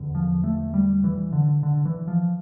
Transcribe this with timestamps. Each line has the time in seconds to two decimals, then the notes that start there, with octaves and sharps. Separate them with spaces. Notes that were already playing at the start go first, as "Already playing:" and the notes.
Already playing: E2 D3
0.15 F3
0.44 A3
0.74 G3
1.04 E3
1.33 D3
1.63 D3
1.85 E3
2.08 F3